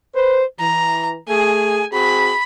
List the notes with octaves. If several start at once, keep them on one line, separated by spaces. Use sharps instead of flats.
B4 C5
E3 A#5
A3 G#4 G#5
C4 F#4 G#4 B5